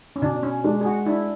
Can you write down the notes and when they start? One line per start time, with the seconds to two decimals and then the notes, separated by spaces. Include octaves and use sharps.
0.16 C#4
0.22 B2 D4
0.43 C#4
0.64 G#3 D4
0.81 G#4
0.85 F#4
1.06 D4 E4